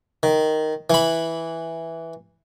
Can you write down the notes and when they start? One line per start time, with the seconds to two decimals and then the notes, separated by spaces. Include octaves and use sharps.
0.23 D#3
0.90 E3 B5